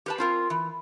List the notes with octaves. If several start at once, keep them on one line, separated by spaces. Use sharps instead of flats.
G4 B4 A5
C4 F4 A#4
E3